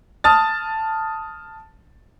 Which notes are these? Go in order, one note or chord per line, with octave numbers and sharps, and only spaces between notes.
A5 D#6 F6 A6